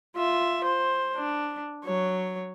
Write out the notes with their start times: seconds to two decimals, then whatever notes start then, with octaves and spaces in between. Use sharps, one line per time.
0.15 F4 E5
0.64 C5
1.16 D4
1.84 F#3 C#5